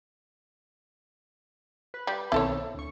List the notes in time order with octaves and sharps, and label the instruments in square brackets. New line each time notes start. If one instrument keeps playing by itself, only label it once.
[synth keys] B4
[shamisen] G3
[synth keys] B1 D#3 C4 [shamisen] E4 A4 C#5
[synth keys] D2 C#6